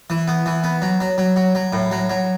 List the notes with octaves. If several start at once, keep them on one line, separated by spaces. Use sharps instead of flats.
E3
B3
E3
B3
F#3
F#3
F#3
F#3
F#3
A2
F#3
F#3